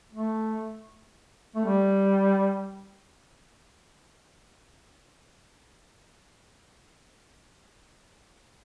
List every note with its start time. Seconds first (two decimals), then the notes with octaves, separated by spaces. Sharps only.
0.13 A3
1.55 A3
1.65 G3